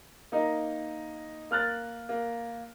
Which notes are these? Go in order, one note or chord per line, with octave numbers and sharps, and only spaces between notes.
A#3 D#4
A#3 F6 F#6 A6
A#3